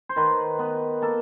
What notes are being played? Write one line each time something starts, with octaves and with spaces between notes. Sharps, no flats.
C5
D#3 B4
B3
A#3 A4